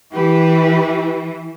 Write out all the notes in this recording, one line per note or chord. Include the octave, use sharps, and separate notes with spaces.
E3 G4 B4